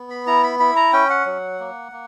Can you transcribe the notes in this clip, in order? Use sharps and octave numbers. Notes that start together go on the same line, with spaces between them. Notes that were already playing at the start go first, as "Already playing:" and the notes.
Already playing: B3
B5
E4 A#5
B5
E4 B5
A#5
C#4 G5
F#5
F#3
A#3
A#3